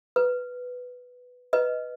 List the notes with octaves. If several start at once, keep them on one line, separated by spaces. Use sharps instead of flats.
B4
B4 D#5